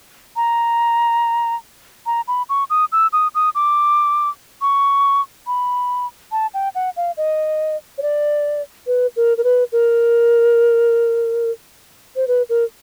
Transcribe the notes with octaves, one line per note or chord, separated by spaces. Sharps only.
A#5
A#5
B5
C#6
D#6
E6
D#6
D#6
D6
C#6
B5
A5
G5
F#5
F5
D#5
C#5
D5
B4
A#4
A#4
B4
A#4
C5
B4
A#4